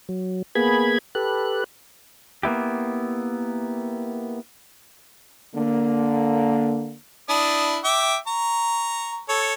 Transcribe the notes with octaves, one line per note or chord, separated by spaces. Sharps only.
F#3
A#3 B3 G#4 B5 G#6
G4 A4 B4 F#6
A#3 B3 E4 G4
D3 A#3
D4 E4 D#6
E5 G5 D6
A#5 C#6
A4 C#5